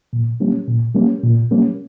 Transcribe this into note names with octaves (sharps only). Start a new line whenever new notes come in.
A#2
G3 A#3 C#4
A#2
G3 A#3 C#4
A#2
G3 A#3 C#4